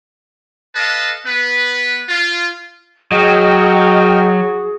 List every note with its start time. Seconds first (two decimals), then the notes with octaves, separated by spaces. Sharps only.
0.76 A4 B4 D#5 F5 A5
1.27 B3 B4
2.09 F4
3.12 F#3 F#4 G#4 D#5 G5 F6